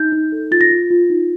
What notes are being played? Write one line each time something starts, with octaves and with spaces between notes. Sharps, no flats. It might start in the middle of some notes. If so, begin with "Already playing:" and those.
Already playing: D#4 G6
D#4
A4
F4 A6
A#6
F4
F4
D#4